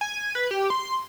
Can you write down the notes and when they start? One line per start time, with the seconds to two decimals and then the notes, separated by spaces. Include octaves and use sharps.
0.01 G#5
0.35 B4
0.51 G4
0.70 C6